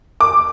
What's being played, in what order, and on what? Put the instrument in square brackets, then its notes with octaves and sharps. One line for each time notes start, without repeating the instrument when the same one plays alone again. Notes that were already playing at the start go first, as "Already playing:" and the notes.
[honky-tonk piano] D6